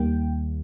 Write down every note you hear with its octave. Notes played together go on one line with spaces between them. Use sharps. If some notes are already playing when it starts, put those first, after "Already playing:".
Already playing: D#2 D#3 G3 A#3 G5